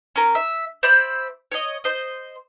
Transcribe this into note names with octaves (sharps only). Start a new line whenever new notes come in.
C#4 A#4
E5
C5 D5 E5 B5
C#5 D#5
C5 D#5